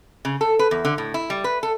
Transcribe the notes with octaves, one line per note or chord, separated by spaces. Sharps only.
C#3
A4
B4
E2
D3
A2
E4
G3
B4
A4